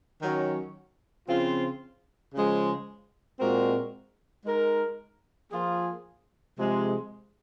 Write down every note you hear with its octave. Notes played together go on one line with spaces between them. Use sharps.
D#3 F#3 C#4
C#3 F3 C4 F4
C#3 F3 G#3
A#2 G#3 C4 F#4 A#4
G#3 D#4 A#4
F3 A#3 F4 G#4
C3 F3 G#3